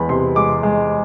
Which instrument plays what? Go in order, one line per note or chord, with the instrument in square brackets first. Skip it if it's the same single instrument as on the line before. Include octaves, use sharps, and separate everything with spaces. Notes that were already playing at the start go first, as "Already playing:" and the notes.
Already playing: [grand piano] E2 G#3 B5
C3 C6
G#3 D6
G#3